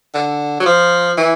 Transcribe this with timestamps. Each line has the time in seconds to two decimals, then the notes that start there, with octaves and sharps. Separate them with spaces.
0.15 D3
0.60 F#3
0.66 F3
1.18 E3